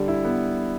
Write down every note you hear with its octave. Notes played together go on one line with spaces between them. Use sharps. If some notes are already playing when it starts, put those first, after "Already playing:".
Already playing: D3 G3
E4
B3